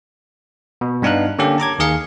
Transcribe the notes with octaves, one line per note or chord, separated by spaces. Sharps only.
B2
G2 B3 D4 D#4 F5 F#6
D3 A#3 C#4 G4
A5 A#5 D6 G#6
D#2 D#3 G#4 F5 C#7